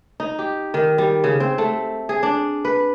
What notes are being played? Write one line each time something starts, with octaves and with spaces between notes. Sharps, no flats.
D#4
G4
D#3
G3
C#3
C4
A3
G#4
D4
B4